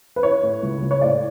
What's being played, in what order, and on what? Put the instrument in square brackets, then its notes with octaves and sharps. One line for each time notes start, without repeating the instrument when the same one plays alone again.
[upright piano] B4
E4 C#5
A2
C#2
C#2
C#5
A2 D5